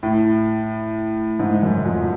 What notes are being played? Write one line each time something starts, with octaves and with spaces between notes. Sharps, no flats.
A2
G#2
F#2
F2